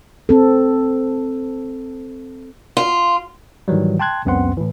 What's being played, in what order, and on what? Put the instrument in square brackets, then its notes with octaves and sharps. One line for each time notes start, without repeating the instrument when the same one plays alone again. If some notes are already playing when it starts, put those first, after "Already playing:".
[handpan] C4 A4
[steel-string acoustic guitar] F4
[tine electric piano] G#2 D#3 E3 F#3 G3
G5 A5 C6 F#6 G#6
C#2 F#2 B3 C4 F#5 C6
A2 E3